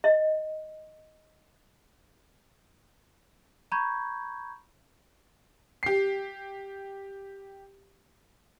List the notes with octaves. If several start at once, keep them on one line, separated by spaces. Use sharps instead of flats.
D#5 E5
A#5 B5 C#6 G6 G#6
G4 C7